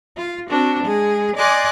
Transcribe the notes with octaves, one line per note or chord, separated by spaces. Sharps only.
F4
C4 D4 F#4
G#3 G#4
D5 D#5 G#5 C6 D6 F#6